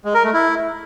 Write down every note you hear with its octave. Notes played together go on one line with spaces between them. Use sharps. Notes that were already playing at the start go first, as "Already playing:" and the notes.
G#3
A#4
A3
E4